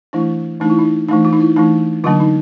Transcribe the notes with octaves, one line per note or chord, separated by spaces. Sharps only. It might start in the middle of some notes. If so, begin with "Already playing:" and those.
E3 A3 D4 E4
E3 A3 D4 D#4
E4
D#4
E3 A3 D4 D#4
F4
D#4
E4
E3 A3 D4 D#4
D3 F#3 A#3 D4 F4
D#4